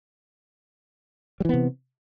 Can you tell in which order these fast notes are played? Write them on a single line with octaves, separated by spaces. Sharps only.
G3 E3 B3 C3